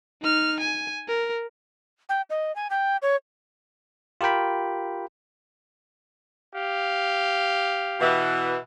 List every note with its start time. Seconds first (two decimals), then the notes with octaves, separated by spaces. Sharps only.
0.22 D#4 F6
0.60 G#5
1.08 A#4
2.09 G5
2.30 D#5
2.56 G#5
2.70 G5
3.02 C#5
4.21 F4 G4 A#4 G5 B5
6.55 G4 F5
8.00 B2 E3